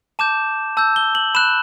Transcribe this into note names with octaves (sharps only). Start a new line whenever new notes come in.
A5 D6 G6 E7
A5 E6 G6
G7
F#7
B5 F#6 E7